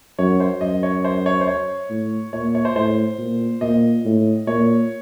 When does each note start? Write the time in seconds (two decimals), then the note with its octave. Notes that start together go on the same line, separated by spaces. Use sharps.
0.18 F#2 C#5
0.40 C5
0.61 F#2 D#5
0.83 C#5
1.04 C5
1.26 C#5
1.41 C5
1.48 C#5
1.90 A2
2.33 A#2 C#5
2.55 C#5
2.65 C5
2.76 A2 C5
3.18 A#2
3.61 A#2 D#5
4.05 A2
4.47 A#2 C#5